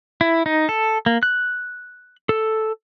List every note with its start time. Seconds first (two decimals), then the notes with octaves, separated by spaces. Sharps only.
0.21 E4
0.46 D#4
0.69 A4
1.06 A#3
1.23 F#6
2.29 A4